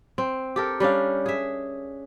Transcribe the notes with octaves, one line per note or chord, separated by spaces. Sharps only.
C4
G4 A4 A#4
G3 C#4 D4 F5
G#4 E5